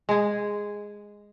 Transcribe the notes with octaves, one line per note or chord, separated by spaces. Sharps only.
G#3 G#4